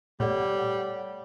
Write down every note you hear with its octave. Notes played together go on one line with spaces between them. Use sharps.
A#2 G3 A3 C#5 D5 F#5